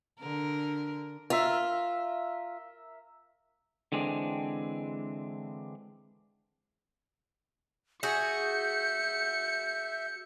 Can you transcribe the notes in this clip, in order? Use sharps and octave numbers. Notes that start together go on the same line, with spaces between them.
D3 A#4
F4 A#4 E5
D3 E3 G#3 C4 D4
F#4 G#4 E5 G6 C#7